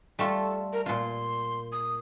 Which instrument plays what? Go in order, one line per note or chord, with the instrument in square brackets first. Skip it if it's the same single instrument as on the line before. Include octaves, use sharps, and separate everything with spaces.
[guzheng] G3 A3 F4 [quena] A4
[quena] A#4
[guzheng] A#2 F4 [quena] C6
[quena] D#6